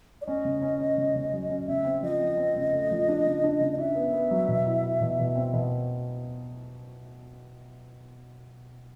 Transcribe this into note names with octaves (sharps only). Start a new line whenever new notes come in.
D5
C#4 D#5
C#3
C#4
C#4
C#3
C#3
F#3
C#4
C#3 E5
C4
F3 D#5
C4
C4
C#3
A3
F3
D4
C#3
D4
C#3
D#5
D4 E5
B3
B3
F#3
B2
E4
E4
B2
B2
C4
B2